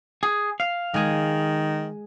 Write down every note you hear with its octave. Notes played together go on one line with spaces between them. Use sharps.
G#4
F5
D#3 G#3 G#4